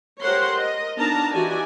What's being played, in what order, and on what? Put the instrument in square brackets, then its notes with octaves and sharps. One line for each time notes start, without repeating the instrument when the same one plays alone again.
[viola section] G4 A#4 C5 C#5 F#5 C6
A#4 D#5
B3 D4 D#4 A#4 A5 A#5
E3 D#4 F#4 G4 D5 G#5